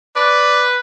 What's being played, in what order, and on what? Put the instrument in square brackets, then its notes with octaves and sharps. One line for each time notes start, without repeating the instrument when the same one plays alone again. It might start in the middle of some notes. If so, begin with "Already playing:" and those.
[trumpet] B4 [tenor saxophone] D5